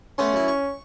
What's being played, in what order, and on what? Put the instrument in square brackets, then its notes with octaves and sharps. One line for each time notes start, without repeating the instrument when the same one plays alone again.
[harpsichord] A3 B3 C6 [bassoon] C#4
[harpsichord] F#2 E4
C#6